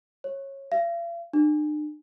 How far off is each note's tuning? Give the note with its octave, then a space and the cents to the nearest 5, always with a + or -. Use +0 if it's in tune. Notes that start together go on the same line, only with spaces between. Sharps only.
C#5 -20
F5 -45
D4 +45